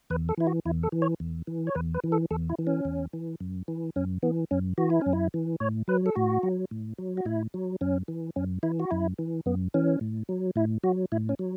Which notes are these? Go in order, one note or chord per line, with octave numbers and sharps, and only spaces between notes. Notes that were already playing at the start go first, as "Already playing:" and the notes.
E2 B4
A4
E3 E4
F#4
E2 E4
A4
E3
C#5
E2
E3
C#5
E2 B4
B4
E3
A4
E2 A4
E4
E3
C#4
E2
E3
F#2
E3
F#2 C#4
E3 B3
F#2 C#4
E3 F#4
E4
C#4
F#2
E4
E3
A2 C#5
F#3 B4
A4
A2 F#4
F#3
A2
F#3
F#4
A2 E4
F#3
F#2 C#4
E3
F#2 C#4
E3 E4
F#4
F#2 E4
E3
F#2 B3
E3 C#4
A2
F#3
A2 E4
F#3 F#4
A2 E4
C#4
F#3